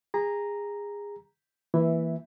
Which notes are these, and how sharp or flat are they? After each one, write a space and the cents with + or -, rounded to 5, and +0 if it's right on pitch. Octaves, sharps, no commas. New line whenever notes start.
G#4 -25 A#5 +0
E3 +0 A#3 +0 E5 -10